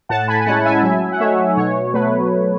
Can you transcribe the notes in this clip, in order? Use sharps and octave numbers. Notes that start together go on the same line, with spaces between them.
A2 F#5 A5
G#5 B5
G#5
G#3 C#4 E4 F#5 A5
F#5
E5 G#5
F#3 E5 G#5
F#5
A3 D#4 C#5 E5
B2 C#5
F#3 A3 B4